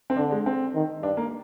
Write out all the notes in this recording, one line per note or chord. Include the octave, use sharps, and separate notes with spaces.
C4
D3 D4
G#3
C4
D#3
G2 D4
A#3